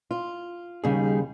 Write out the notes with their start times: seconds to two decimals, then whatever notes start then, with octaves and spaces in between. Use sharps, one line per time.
0.11 F4
0.84 D#2 C#3 G3 D#4 G#4